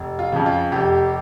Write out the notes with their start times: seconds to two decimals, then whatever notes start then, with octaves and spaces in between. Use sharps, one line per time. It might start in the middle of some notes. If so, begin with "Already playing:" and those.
Already playing: F1
0.19 F4
0.32 F2 C#3
0.46 F4
0.72 F1 G4